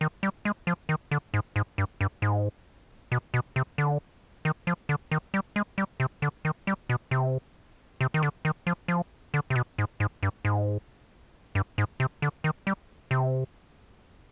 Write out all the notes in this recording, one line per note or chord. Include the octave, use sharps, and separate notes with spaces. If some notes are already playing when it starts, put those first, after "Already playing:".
D#3
G3
G#3
F3
D#3
D3
G#2
G#2
G2
G2
G#2
B2
B2
C3
D3
D#3
F3
D3
D#3
G3
G#3
G3
C3
D3
D#3
G3
B2
C3
C3
D#3
D3
D#3
F3
F3
D3
C3
B2
G#2
G#2
G2
G#2
G2
G#2
C3
D3
D#3
G3
C3